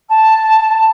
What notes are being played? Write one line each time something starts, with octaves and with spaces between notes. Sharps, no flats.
A5